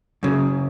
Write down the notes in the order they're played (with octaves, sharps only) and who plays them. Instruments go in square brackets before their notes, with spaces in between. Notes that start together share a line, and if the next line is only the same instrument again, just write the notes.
[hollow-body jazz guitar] F#2 C#3